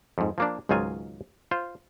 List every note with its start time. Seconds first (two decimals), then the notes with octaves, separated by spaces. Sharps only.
0.18 F2 G#2
0.38 F3 A#3 D4
0.69 C#2 G#2 D#3 F#3 F4 G#5
1.51 F4 C5